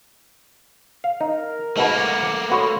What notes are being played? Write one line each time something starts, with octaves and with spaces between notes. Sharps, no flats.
F5
D#4 A#4
G#2 B2 A3 A#3 B4
F#5 D6
B3 F#4 A4 C#5 C6